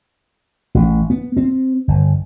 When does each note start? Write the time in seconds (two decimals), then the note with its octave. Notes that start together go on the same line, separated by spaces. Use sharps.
0.75 A1
1.10 B3
1.37 C4
1.88 G1